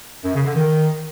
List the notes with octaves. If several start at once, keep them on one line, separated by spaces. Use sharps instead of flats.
F#2
C#3
D3
D#3